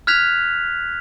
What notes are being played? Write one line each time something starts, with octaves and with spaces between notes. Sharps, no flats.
F6 F#6 G#6 B6 F7